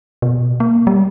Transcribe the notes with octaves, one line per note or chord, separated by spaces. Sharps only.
B2
A#3
G3